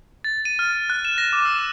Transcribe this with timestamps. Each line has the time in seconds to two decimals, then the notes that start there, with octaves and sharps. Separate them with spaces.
0.24 A6
0.45 D#7
0.59 F6
0.90 F#6
1.05 E7
1.18 A#6
1.33 D6
1.45 E6
1.59 E7